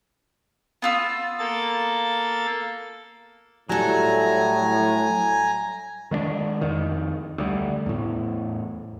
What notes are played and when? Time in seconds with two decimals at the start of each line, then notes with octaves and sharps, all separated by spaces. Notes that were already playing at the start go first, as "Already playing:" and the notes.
0.82 B3 F4 E6
1.39 A#3 A4 A6
3.69 A2 F#3 G3 A4 G#5 A#5
6.11 D#3 G#3 B3 D4
6.61 F2 D#3
7.38 D2 G3
7.86 E2 A2